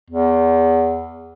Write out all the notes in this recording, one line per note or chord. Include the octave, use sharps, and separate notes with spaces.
E2